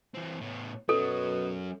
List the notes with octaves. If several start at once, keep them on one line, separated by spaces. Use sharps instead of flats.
E3 C4
A2 B3
B2 F#3 C#4 A4